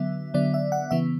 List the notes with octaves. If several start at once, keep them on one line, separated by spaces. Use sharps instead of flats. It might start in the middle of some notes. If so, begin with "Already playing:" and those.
Already playing: D3 F#3 B3 E5
D3 F#3 B3 D5
E5
F#5
C#3 E3 B3 E5